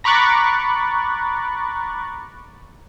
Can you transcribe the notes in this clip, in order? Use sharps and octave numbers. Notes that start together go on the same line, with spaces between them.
A#5 B5 C#6 D6 F#6 A6